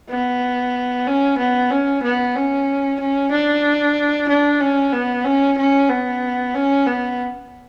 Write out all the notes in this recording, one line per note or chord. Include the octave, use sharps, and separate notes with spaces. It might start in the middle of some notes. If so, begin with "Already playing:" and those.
B3
C#4
B3
C#4
B3
C#4
C#4
D4
D4
C#4
B3
C#4
C#4
B3
C#4
B3